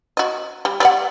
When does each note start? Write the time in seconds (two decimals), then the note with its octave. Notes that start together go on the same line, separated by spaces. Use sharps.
0.17 F#4 D#5
0.65 G3
0.80 G3 D5 F#5